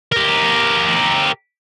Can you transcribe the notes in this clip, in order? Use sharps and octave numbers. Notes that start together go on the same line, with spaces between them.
G4 A#4